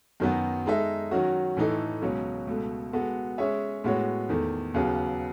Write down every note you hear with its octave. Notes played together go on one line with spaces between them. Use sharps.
F#2 D#3 F#3 B3 F#4
G#3 D#4 A4 E5
D#3 F#3 C#4 F#4
A2 E3 A3 D#4 A4
C#2 B2 F#3 C#4
C#2 B2 A3
G#3 B3 F#4 A4
G#3 C#4 G#4 C#5 E5
A2 G#3 B3 F#4 C#5
E2 D#3 A3
D#2 C#3 F#3 B3